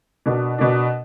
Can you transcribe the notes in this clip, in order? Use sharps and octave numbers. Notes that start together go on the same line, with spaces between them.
B2 A#3 D4
B2 A#3 D4